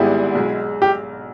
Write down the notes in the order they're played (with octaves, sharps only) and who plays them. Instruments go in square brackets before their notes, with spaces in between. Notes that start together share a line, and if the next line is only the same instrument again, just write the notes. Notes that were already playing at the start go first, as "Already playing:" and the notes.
Already playing: [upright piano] G#1 G#2 G3 B3 G4 [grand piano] E4 G#4
[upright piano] B1 B2 G#3
[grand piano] G4